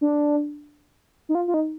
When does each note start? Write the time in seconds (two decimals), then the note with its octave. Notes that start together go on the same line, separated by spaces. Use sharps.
0.01 D4
1.29 D#4
1.35 F4
1.48 F4
1.54 D#4